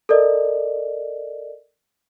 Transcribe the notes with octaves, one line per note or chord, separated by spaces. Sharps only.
A4 A#4 D5 D#5